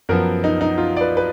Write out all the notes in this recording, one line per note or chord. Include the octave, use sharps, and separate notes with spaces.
F#2 F3 B3 A#4
D#4
D#4
F4
D5
B4
B4